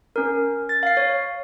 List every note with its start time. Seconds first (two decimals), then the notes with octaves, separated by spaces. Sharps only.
0.16 C#4 A#4
0.69 A6
0.83 F5 C7
0.97 C#5